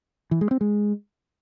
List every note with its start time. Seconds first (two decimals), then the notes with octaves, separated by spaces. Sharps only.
0.31 E3
0.41 G#3
0.51 C4
0.61 G#3